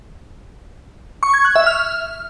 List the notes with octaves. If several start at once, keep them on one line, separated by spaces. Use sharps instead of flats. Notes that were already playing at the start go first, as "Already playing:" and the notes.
C#6
G#6
F#6
E5
F6